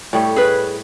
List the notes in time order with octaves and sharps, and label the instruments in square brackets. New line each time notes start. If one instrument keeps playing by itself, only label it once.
[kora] A2 G3 C#5
[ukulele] G#4 B4